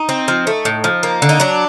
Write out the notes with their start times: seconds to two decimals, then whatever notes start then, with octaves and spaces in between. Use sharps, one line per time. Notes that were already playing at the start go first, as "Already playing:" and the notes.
Already playing: D#4
0.09 C4
0.28 F3
0.47 A3
0.65 A2
0.84 F3
1.03 A#3
1.22 D3
1.29 D#4
1.40 F#3 D4